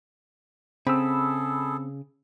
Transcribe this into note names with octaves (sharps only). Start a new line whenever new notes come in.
C#3 C4 G#4 A4 B5 E6